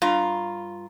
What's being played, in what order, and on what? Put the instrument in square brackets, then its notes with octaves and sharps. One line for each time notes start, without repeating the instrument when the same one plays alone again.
[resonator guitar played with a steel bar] G2 F4 A#5